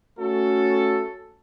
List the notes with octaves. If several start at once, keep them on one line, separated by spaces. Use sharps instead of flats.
A3 C#4 F#4 A4